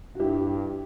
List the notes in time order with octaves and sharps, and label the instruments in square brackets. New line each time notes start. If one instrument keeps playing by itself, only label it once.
[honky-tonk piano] F#4
[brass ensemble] G2 [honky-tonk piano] E4 G4